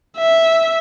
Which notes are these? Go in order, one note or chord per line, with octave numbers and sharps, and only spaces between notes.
E5